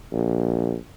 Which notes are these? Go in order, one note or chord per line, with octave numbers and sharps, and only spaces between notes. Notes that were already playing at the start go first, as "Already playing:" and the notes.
A#1